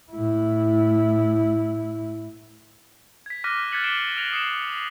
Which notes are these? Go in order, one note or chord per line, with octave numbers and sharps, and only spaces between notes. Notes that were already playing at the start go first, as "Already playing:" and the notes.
A2 E4
G#6 B6
D6 F6 F#6 A#6 B6 D#7
F#6 G#6 A6 B6 C#7 F#7
D6 B6 C7 D7 E7 G7
F6 A#6 D7 F7 F#7
D#6 C7 C#7 E7